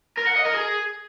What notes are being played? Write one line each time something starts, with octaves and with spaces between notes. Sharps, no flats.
A#4
F#5
D#5
A#4
G#4